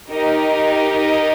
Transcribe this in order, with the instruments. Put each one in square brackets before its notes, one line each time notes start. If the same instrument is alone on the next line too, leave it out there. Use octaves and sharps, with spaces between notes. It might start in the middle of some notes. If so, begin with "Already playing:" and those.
[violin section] D#4 G4 A#4 D#5